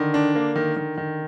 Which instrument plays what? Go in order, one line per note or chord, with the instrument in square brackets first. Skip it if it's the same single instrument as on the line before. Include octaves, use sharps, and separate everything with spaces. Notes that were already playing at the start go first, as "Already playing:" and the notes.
Already playing: [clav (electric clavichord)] D3 [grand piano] D#3
[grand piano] D4
A#3
D#3
D#3
D#3